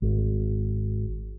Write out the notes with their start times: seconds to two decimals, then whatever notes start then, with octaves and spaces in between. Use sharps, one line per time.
0.02 G#1